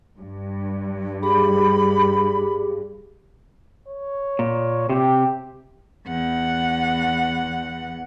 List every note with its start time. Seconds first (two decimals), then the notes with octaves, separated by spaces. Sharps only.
0.18 G2
1.23 G4 G#4 B5 D6
3.88 C#5
4.39 A#2
4.90 C3 G4
6.07 E2 F#5